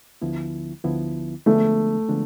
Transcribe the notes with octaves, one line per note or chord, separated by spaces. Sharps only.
D2 D3 F3 B3 E4
D2 D3 F3 B3 E4
D3 F3 G#3 A3 B3 D4
D3 F3 G#3 B3 D4